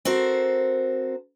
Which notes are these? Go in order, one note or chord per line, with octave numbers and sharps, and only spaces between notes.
C4 F#4 A4 A#4 C5